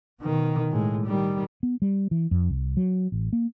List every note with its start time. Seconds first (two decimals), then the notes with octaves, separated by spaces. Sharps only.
0.21 B2 D#3
0.71 A2 G#3
1.07 D#3 G3
1.63 B3
1.82 G3
2.11 E3
2.31 F2
2.50 C2
2.77 F#3
3.12 A1
3.33 A#3